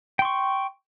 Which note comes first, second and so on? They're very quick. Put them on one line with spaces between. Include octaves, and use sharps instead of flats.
G5 C6 C#6